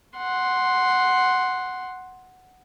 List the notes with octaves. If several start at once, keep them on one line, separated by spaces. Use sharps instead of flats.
F#5 C6